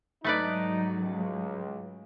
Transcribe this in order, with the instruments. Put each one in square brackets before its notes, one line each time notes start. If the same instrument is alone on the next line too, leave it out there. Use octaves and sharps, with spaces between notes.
[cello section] G#2 F#3 [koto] A3 B4 D5 [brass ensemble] D#4
[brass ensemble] C#2